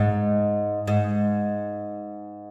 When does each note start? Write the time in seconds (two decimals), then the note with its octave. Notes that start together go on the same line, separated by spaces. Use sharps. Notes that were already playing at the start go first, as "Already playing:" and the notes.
Already playing: G#2
0.87 G#2